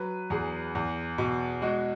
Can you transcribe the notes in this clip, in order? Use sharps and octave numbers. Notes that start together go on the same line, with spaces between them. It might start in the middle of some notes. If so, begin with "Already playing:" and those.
Already playing: F#3 B4
E2 G#4
E2
B2
G#3 F#4